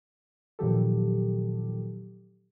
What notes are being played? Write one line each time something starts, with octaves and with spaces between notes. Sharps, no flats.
A#2 D#3 F3 F#3 G4 A4